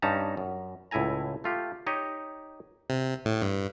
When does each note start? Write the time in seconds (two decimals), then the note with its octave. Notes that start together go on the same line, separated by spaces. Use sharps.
0.02 G2 C#4 D#4 A5 A#5
0.37 F#2
0.91 C#2 A2 E4 A4 G#5 A#5
1.44 A3 F4 G4
1.87 D#4 G4 C#5 D#5
2.90 C3
3.25 A2
3.42 G2